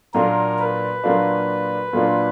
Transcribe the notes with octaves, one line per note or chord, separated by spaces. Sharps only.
A#2 F#3 A#3 D4 F4 A#4
B4
A#2 F#3 A#3 D4 F4
A#2 F#3 A#3 D4 F4